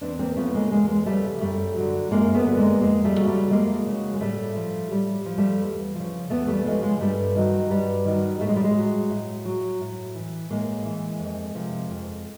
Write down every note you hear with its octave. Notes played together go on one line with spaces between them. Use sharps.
E2 C4 D4
A#3 C4
C#3 F3 A3 B3
G#3 A#3
E2 G#3 A#3
G#3
C#3 F3 G3 A3
F#2 G3 A3
D3 F#3
F#2 G#3 A#3
A3 B3
D3 F#3
G#3 A#3
F2 G#3 A#3
G3 A3
C#3 F#3
G3 A3
F2 G#3 A#3
C#3 F#3
G#3
A2 G3 A3
F3
A2 G3
F3
G3 A3
E2
C#3 F3
E2 A3 B3
G3 A3
C#3 F3 G#3
G#3
G2 G3 A3
D#3 F#3
G2 G3
D#3 F#3
A2 A3
G#3
G3
G#3
F#3
A2
F#3
A2
E3
A2 G#3 A#3
E3
F2
C3 F3
F2